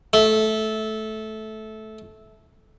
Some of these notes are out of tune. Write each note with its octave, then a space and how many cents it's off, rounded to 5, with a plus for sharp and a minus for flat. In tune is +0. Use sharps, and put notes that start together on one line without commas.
A3 -15